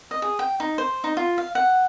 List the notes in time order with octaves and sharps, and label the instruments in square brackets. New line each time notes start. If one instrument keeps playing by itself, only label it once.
[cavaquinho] D#5
G#4
G5
D#4
C5
D#4
F4
F5
F#5